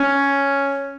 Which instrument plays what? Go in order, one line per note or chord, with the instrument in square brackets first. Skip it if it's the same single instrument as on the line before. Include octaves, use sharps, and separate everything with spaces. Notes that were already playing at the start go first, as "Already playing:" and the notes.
Already playing: [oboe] C#4